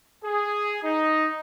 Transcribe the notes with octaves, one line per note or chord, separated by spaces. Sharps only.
G#4
D#4